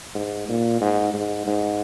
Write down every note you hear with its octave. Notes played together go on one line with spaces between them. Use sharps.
G#2
A#2
G#2
G#2
G#2